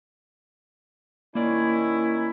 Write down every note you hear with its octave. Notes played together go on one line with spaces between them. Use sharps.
D#3 A#3 C#4 E4 D5